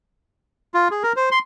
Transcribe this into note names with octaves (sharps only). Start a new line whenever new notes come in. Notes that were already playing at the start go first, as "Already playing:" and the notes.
F4
G#4
A#4
C5
C6